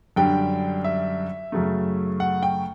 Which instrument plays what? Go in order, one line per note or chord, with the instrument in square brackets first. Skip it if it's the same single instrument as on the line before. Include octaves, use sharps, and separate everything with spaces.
[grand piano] F#2 D3 G3 G5
E5
F#2 C#3 F#3 A3
F#5
G5